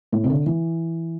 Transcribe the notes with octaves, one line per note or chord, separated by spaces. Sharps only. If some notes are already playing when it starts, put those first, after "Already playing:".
A2
C3
D3
E3